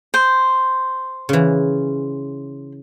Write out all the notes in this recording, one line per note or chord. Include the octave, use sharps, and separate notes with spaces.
C5
C#3 E3